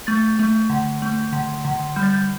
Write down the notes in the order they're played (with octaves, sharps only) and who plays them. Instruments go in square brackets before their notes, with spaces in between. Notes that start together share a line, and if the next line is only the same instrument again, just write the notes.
[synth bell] A3 A6
A3
D3
A3
D3
D3
G3 G6
A6
G6